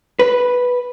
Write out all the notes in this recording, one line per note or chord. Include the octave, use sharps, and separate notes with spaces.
B4